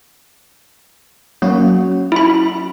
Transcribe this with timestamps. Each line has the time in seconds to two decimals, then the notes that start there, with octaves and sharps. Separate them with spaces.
1.42 F#3 A#3 C#4 F#4
2.12 E4 B5